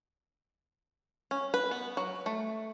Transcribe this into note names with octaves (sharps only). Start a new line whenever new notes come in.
C#4
B4
B3
F#3
A3